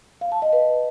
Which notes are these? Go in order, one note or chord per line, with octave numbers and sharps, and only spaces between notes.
F5
A5
D#5
B4